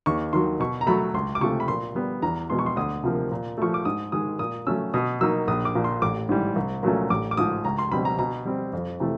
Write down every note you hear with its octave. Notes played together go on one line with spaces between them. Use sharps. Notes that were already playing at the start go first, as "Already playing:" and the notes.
D#2 C#6
D#3 F#3 C6
B2 C#6
A#5
F#3 A3 B5
C#2 C6
D6
C3 F3 A3 C#6
B5
A#2 C6
G3 B3
E2 A#5
B2 G#3 B3 C6
C#6
C6
D2 D#6
C3 F3 A#3
A#2
F3 A3 C#6
D6
G#2 D#6
D#3 G#3 D#6
A#2 D#6
F#3 A3 C#4 E6
B2 D#6
F#3 A#3 D#4 E6
A#1 D#6
D6
A#2 F3
C6
A1 D6
G#2 E3 G3
C2
A#2 F#3 A3 C#4
A1 D6
D6
G#2 F3 D#6
C#2 A#5
C6
B2 G3 C4 B5
A#5
B2 A#5
G3 C4
F2
C3 E3 A3